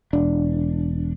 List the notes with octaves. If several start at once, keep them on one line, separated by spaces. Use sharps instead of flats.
E1 D4